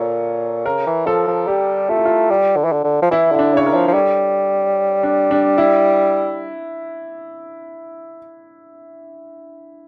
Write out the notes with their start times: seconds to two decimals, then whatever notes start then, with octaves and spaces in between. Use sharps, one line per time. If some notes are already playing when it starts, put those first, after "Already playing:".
Already playing: A#2 F4 A4 A#4 C#5
0.66 C#3 A#4
0.87 E3
1.07 F3 A4
1.27 F3
1.47 G3 G4
1.89 A3 F4
1.97 E4
2.05 F4
2.30 G3
2.57 D3
2.65 E3
2.72 D3
2.84 D3
3.02 F3
3.11 E3 E4
3.32 D3 E4
3.39 D4
3.53 C#3 C#5
3.66 A#4
3.74 F3
3.88 F3
3.94 G3 A4
5.03 D4
5.31 D4
5.58 E4